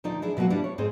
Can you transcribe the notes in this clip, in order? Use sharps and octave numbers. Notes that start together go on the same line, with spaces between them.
D2 A#2 F3 D#4 D5 A#5
D4 E4 G#4
B2 F#3 G#3 A#3 F#4
F3 G3 D4 E4
C#5
F2 G#2 C4 G#4 C5